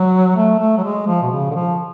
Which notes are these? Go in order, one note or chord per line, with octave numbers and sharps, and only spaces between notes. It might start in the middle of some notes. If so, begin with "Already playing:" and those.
Already playing: F#3
A3
A3
F#3
G#3
F3
B2
C#3
D3
F3